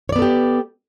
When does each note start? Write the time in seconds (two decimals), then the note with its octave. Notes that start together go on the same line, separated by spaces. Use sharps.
0.09 C#5
0.12 D5
0.16 B3
0.19 A4
0.22 G4